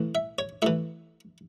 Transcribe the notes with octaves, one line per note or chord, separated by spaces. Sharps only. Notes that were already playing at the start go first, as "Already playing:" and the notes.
Already playing: A2 E3
E5
C#5
A2 E3 E5